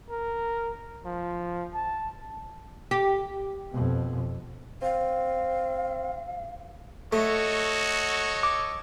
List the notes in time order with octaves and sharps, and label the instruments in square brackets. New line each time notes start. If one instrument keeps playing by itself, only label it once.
[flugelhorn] A#4
F3
A5
[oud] G4
[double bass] F2 B2
[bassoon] C4 [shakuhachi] F5
[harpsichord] A3 [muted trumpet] F#4 [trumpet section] A4 C#5 D#5
[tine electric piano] D6